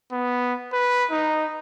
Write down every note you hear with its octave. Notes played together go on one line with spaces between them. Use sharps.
B3
B4
D#4